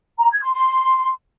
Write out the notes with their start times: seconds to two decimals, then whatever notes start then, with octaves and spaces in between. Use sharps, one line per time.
0.18 A#5
0.30 G#6
0.42 C6
0.53 C6